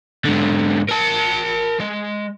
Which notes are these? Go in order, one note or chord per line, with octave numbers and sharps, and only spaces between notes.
G#2 D3
A#4 A5
G#3